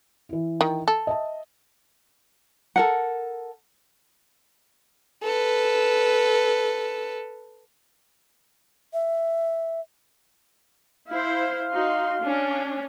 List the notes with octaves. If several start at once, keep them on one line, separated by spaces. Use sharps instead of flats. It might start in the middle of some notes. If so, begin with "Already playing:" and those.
E3 E4
D#3
A4
D#5 E5 A5
A4 A#4 F#5
A4 B4
E5
E4 C5 F5
D#4 F#4 C6
C#4 D4